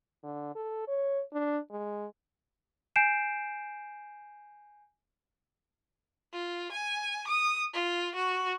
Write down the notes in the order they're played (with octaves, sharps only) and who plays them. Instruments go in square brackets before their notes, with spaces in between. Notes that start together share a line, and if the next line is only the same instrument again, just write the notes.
[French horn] D3
A4
C#5
D4
G#3
[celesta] G#5 G6 C7 D7 E7
[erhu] F4
G#5
D#6
F4
F#4